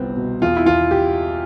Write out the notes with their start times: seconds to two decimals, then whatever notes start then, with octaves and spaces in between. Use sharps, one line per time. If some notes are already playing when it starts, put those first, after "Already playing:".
Already playing: G1 C2 B3 C4
0.17 B2
0.42 E2 F4
0.57 E4
0.66 E2 F4
0.91 G4